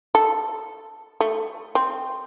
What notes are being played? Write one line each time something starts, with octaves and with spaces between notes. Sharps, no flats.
A4
A3
C4